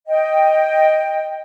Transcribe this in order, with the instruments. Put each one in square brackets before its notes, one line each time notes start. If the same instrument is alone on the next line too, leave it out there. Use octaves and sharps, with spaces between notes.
[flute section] D#5 G5